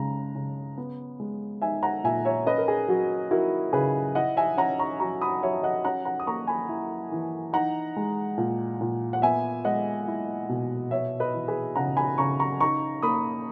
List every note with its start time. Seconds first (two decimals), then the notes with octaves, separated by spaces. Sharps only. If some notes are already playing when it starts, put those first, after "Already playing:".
Already playing: C#3 G#3 A#5
0.36 C#3
0.78 B3
1.20 G#3
1.62 D#4 E5 G#5
1.83 F#5 A#5
2.04 A#2 E5 G#5
2.25 C#5 E5
2.46 C#4 B4 D#5
2.58 A#4
2.68 G#4
2.88 F#3 F#4
3.31 E4 F#4 A#4
3.73 C#3 G#4 B4
4.15 E4 D#5 F#5
4.37 E5 G#5
4.58 C#4 F#5 A#5
4.79 A#5 C#6
5.00 F#3 A#5 C#6
5.22 B5 D#6
5.43 F#3 C#5 E5
5.63 D#5 F#5
5.84 C#4 F#5 A#5
6.05 F#5 A#5
6.20 D#6
6.27 A#3 A#5 C#6
6.47 G#5 B5
6.69 E4
7.12 E3
7.53 D#4 F#5 A#5
7.97 G#3
8.38 A#2
8.81 A#2
9.13 F#5
9.22 B3 E5 G#5
9.65 G#3 D#5 F#5
10.08 E4
10.49 B2
10.91 B3 C#5 E5
11.20 B4 D#5
11.33 E3
11.48 G#4 B4
11.76 C#3 F#5 A#5
11.97 G#5 B5
12.18 C#3 A#5 C#6
12.40 A#5 C#6
12.60 D#4 A#5 C#6
13.03 A#3 B5 D#6